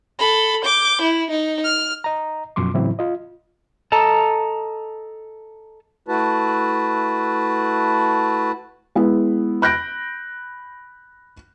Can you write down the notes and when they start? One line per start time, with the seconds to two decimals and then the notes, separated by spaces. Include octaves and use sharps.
0.19 A4 B5
0.64 D6 G6
1.01 E4
1.30 D#4
1.64 F6
2.04 D#5 A#5
2.56 F#2 B2 F3 C6 D6
2.74 A2 C#3 E3 F#3 C4 E4
2.99 F4 D#5
3.92 A4 D#5 A5 A#5
6.08 A3 E4 F#4 B4 A5
8.95 G#3 B3 E4
9.62 B5 F#6 G6 A#6 D7